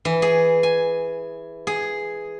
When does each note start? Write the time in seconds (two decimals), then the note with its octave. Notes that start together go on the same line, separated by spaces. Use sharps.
0.05 E3
0.22 G#4
0.63 G#5
1.67 G#4